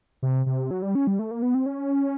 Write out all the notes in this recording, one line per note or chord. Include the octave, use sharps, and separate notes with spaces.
C3
C3
F#3
G3
C#4
G3
A3
A#3
B3
C4
C#4